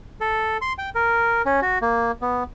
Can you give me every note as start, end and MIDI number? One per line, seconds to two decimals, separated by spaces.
0.21 0.57 69
0.62 0.73 84
0.78 0.90 79
0.95 1.42 70
1.46 1.60 61
1.62 1.78 66
1.82 2.11 58
2.21 2.43 59